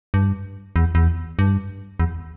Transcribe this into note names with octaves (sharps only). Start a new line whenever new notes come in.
G2
E2
E2
G2
E2